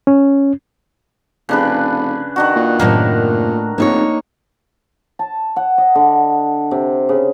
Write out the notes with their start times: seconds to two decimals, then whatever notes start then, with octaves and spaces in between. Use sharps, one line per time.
0.07 C#4
1.49 F1 C#3 D4 B4
2.36 D#3 D4 F#4
2.56 A#2
2.80 F#2 A2 C3 D#3 A#3 A#4
2.97 A#2
3.78 F1 A#3 D#4 C#5
5.19 A5
5.56 F#5
5.78 D#5
5.95 D3
6.71 C3
7.09 C#3